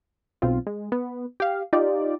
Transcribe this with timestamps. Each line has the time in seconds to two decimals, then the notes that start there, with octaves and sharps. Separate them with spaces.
0.42 B1 C4 F4
0.67 G#3
0.92 B3
1.40 G4 F5
1.73 D#4 F4 G4 D5